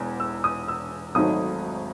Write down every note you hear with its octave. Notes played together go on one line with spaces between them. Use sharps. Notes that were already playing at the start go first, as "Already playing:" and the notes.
Already playing: E1 E2
E6
D#6
E6
G#1 G#2 F#3 A3 D#4 D#6